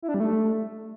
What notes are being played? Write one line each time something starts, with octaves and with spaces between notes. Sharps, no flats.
E4
D4
G3
A3